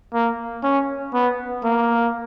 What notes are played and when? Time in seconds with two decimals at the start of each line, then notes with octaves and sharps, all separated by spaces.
0.14 A#3
0.63 C#4
1.14 B3
1.64 A#3